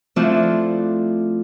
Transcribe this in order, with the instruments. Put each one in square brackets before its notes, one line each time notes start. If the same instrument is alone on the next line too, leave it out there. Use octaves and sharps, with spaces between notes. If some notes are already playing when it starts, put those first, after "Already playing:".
[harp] F3 A3 C4 D4 E4 F4